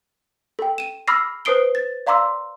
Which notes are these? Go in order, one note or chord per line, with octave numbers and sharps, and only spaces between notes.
A4 G5
D#7 E7
B5 D6 E6 F6 A#6 C7
B4 C5 D#6 C7 D7 G7
A6
D5 F5 A#5 C6 D6 E6